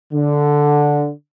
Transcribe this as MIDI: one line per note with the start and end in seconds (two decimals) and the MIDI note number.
0.12 1.11 50